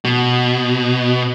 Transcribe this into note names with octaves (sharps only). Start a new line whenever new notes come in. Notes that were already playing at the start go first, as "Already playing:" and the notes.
B2